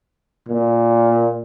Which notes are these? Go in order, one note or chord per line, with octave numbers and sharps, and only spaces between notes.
A#2